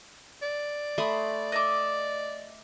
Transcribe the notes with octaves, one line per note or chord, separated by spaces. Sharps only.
D5
A3 B5 C6 D#6
D#5 E5 D6